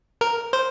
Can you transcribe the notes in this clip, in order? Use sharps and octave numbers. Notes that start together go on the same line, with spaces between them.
A#4
C5